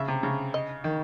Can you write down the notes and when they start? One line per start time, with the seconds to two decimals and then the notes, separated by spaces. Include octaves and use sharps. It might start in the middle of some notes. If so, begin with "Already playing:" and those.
Already playing: C#3 E5
0.08 C3
0.23 C#3
0.54 D#5
0.84 D#3